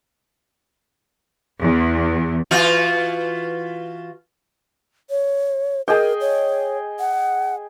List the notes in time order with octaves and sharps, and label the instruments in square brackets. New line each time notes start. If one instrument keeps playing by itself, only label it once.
[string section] E2
[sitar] E3 F4 F#4
[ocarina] C#5
[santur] G#4 D#5 G5 [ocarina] A#4
[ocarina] C#5
F#5